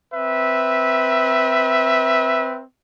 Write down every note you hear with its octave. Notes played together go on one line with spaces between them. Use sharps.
C4 B4 E5